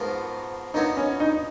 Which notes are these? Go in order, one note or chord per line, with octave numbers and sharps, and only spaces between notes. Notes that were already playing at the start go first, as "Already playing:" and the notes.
Already playing: G#2 F3 B3 F#4 A#4
A#2 F#3 B3 D#4 F#4 C#5
C#4
D#4